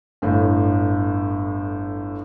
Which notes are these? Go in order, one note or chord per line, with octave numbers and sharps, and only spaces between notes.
G1 A2